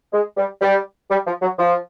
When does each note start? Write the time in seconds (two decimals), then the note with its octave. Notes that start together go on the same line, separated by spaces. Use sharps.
0.13 G#3
0.37 G3
0.62 G3
1.10 G3
1.26 F3
1.42 F#3
1.59 F3